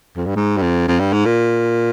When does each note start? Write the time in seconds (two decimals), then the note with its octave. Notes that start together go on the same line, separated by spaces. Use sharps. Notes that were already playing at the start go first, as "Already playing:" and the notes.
0.17 F2
0.26 G2
0.36 G#2
0.57 G2
0.62 F2
0.88 F2
1.00 G2
1.13 G#2
1.25 A#2